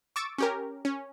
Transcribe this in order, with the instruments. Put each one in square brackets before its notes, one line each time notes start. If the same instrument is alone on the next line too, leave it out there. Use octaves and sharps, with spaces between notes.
[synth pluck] C#6 D6 E6 A6 D7
C#4 G4 A#4
C#4